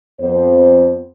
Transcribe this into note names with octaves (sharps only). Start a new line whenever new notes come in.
F2 B3 C5